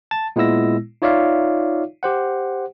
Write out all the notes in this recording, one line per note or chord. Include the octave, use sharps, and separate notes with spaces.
A5 A6
A#2 G#3 B3 E4 E6 A#6
D#4 F4 C#5 D5 E5 F5
G4 C5 F#5